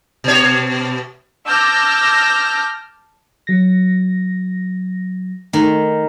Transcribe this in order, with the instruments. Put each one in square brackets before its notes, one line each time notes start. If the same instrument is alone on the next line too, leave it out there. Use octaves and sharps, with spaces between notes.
[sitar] B2 C#5
[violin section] A5 D6 E6 F6 G6 A#6
[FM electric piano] F#3 A#6
[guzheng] D#3 [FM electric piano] A3